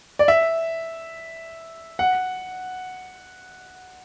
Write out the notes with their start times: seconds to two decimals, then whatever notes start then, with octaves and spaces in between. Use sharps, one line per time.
0.19 D5
0.28 E5
1.99 F#5